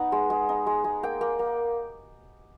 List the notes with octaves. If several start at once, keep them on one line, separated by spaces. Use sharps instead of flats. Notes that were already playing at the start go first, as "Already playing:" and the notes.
Already playing: B3 D#4 F#5
G#3
G#3
D#4
G#3
G#3
A#3 G5
A#3
A#3